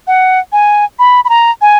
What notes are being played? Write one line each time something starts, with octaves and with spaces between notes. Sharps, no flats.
F#5
G#5
B5
B5
A#5
G#5